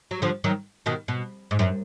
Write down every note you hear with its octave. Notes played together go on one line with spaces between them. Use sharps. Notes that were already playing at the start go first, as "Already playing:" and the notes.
F#3
D3 F3
D#3 F#3
B2 D#3
B2
G#2
F#2